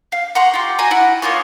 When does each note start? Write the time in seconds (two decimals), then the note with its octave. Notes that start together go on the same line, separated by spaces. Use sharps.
0.12 F5
0.35 F#5 A#5 C6 C#6
0.54 F4 G4
0.79 F#4 G#5 A#5
0.91 E4 F#5
1.22 A#3 B3 F4 C#5